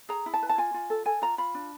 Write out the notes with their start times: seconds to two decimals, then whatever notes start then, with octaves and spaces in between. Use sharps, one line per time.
0.09 G#4 A#5
0.26 E4
0.34 A5
0.42 B4
0.49 A5
0.58 F4 G#5
0.74 F4
0.90 A4
1.06 A4 G#5
1.22 F4 A#5
1.38 F4 B5
1.55 D4